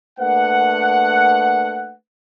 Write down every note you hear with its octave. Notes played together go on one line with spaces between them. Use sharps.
A3 A#3 D4 B4 F#5